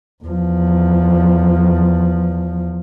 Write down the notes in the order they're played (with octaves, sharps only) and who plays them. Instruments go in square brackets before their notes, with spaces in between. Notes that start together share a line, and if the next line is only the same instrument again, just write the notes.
[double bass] E2 F3